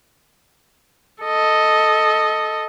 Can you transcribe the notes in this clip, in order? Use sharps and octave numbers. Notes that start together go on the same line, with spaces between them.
A4 D#5